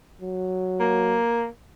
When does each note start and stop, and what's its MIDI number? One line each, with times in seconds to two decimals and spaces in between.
0.21 1.20 54
0.80 1.46 58